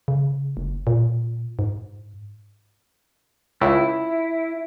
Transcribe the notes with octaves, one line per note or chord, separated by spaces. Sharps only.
C#3
F#1
A#2
G#2
C#2 E4